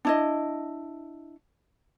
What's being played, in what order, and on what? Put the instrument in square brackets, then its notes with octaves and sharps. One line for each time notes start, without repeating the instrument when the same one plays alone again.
[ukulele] D4 E4 D#5